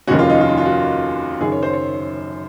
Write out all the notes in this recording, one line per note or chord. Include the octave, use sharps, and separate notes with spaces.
F1 D#2 D#3 G#3 C#4 F#4
F4
D#4
F4
D#4
F4
F#4
F#1 F#2 D#3 G#4
C#5
C5
C#5